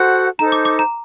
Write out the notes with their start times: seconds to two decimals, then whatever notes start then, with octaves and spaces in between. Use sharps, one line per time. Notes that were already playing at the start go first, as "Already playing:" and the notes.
Already playing: F#4 A4 C5 F#5
0.39 D#4 A4 C5 A#5
0.52 D6
0.65 D6
0.79 A#5